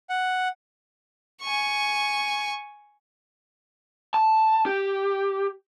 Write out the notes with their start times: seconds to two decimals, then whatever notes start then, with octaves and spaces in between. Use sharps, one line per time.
0.10 F#5
1.42 G#5 C#6
4.14 A5
4.66 G4